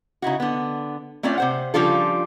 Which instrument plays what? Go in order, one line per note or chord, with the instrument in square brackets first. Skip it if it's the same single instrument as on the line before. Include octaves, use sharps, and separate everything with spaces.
[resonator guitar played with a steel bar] C#3 D#4 E4 F#4
D3 B3
A3 C4 C#4 F4 D5
C3 C5 F#5
C#3 F3 G3 D4 F4 A4